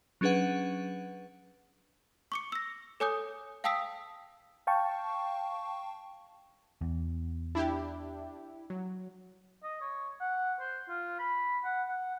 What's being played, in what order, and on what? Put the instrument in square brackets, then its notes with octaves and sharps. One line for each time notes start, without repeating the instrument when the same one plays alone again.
[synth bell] F#3 C#4 D4 G#4 B4 F#5
[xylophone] C#6 D6 C#7
E6 A#6
A4 C#5 G#5 D6 D#6 G6
F5 G5 A5 D#6 E6 B6
[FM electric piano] F5 G5 A5 C#6
[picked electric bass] E2
[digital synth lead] D4 [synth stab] E4 G4
[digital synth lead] F#3
[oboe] D#5
C#5
F#5
C5
F4
B5
F#5
F#5